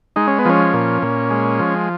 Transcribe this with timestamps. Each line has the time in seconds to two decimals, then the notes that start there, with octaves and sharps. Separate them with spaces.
0.16 G#3 D#4
0.27 C#4
0.39 B3
0.45 F3 C#4
0.74 A#2
1.02 A#2
1.31 G#3
1.60 F3